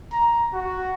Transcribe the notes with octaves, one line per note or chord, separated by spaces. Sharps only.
A#5
F#4